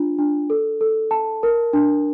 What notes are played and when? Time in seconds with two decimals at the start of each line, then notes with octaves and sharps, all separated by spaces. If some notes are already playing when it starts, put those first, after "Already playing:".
Already playing: D4 F4
0.18 D4
0.50 A4
0.81 A4
1.11 A5
1.43 A#4
1.73 D4